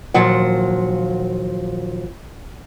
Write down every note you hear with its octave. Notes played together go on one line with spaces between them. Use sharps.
D#2 A#2 F3 F#3 F#5